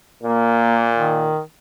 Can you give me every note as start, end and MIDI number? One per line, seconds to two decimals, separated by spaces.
0.23 1.33 46
0.23 0.90 58
0.95 1.39 51